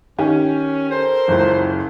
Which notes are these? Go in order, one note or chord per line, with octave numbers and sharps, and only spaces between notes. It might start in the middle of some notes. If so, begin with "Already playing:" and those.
D#3 C#4 G4 G#5
A4 A#4 C5
F#1 C#2